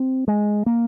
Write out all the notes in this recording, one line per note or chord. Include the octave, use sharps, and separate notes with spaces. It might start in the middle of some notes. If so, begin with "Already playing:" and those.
Already playing: C4
G#3
A#3